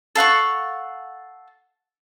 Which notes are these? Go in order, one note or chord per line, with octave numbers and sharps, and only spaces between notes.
A4 F5 F#5 C#6